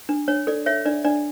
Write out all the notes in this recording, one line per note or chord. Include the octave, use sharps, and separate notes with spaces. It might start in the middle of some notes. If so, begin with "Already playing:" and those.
D4
D4 C#5
A4 D5
C#5 E5
D4 D5
D4 D5